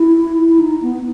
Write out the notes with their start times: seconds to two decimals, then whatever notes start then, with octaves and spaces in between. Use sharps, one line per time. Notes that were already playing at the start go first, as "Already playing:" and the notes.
Already playing: E4
0.48 E4
0.59 D#4
0.82 B3